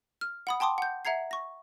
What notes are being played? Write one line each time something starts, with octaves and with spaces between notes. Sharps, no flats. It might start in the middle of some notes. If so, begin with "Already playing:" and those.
F6
F#5 B5 D#6
G5 A5 C6 D6 D#6
F#5 G6
E5 F#5 A#5 G#6 C7
C#6 A#6